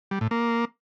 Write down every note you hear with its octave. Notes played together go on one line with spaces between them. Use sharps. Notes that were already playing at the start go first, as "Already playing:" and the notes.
G3
A2
A#3